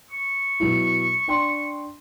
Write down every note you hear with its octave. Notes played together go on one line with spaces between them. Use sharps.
C#6
B2 F#3 E4
D4 G5 C6